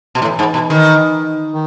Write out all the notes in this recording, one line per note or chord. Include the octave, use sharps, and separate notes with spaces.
B2
A2 E3
G#2
B2
D#3
D#3